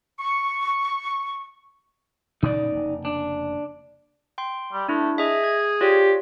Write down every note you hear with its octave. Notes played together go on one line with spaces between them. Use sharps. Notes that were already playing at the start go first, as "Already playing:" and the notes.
C#6
A#2 C#3 C#4 D#4 D5
F1 C#3 A#3
D4
G5 C6
G3
A3 D4 E4
G#4 D#5 E5
G#6
F4 G4 C#5 D5